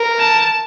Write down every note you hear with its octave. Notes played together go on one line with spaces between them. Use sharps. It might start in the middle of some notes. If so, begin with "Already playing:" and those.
Already playing: A#4
A5